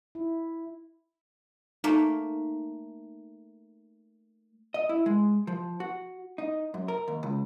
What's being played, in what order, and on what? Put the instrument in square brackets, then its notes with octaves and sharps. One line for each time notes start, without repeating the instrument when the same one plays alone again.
[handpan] E4
[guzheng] A3 A#3 [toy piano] D#4
[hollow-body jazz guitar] D#5
E4
G#3
F3
F#4
D#4
F#2
A#4
D#2
C#2